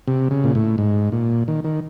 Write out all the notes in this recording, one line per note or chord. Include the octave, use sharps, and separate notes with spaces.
C3
C#3
A#2
A2
G#2
A#2
D#3
D#3